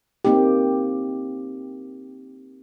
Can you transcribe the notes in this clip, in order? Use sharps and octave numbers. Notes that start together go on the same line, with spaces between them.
A#3 C4 D#4 G4